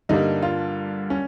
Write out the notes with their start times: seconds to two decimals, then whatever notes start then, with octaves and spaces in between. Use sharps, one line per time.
0.09 G2 D3 G3 A#3 D#4
0.42 F4
1.10 C#4